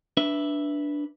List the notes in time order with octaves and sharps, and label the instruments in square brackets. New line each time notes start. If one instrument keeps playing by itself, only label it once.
[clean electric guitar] D4 B4 E5